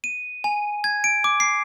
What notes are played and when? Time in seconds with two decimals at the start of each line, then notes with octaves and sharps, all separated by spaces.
0.04 D#7
0.44 G#5
0.84 G#6
1.04 D7
1.24 D6
1.40 C7